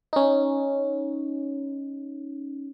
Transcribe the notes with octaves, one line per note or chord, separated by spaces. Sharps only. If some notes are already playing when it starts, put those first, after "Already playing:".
C#4 D#4